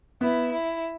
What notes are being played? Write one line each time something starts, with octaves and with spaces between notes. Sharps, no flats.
B3 E4
E4